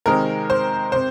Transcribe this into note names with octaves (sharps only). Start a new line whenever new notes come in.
C3 D#3 G#3 C4 A#4
C5
C3 C5